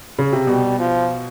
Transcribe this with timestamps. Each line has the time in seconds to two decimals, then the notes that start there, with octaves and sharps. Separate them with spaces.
0.19 C#3
0.32 C3
0.47 B2 G3
0.79 F3